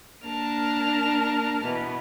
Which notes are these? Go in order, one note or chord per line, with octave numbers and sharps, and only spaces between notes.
A#3 D4 A#4 A5 F6
B2 E3 B3